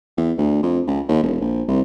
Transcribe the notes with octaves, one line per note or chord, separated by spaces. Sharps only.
E2
D2
F2
C#2
D#2
E1
A#1
C2